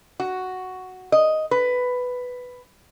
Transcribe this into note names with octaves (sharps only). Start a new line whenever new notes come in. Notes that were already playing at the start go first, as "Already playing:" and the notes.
F#4
D#5
B4